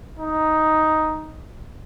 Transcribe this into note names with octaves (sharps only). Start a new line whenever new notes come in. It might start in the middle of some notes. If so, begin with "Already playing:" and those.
D#4